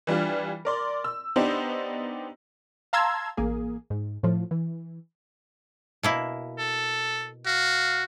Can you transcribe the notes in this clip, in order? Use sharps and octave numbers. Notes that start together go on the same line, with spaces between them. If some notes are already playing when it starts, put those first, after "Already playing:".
E3 G3 D4 F4
A#4 D5 C6
E6
B3 D4 D#4 G4 C5
F5 A5 A#5 C6 E6 G#6
A1 A#3 G#4
G#2
A2 F3
E3
B2 A#3 E4
A4
F#4 F5